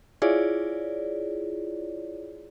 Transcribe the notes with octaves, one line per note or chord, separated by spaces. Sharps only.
E4 F4 G#4 C#5 D5